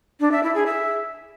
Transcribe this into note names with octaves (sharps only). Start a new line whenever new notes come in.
D4
E5
E4
G#4
E5